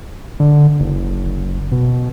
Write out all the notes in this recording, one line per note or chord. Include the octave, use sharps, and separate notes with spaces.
D3
F#1
B2